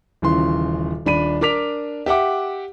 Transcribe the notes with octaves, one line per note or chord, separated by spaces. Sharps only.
D#1 C#3 E3 C6
D#1 D4 B5 D#7
D4 A#4 D6 B6 F7
G4 E5 F#5 D6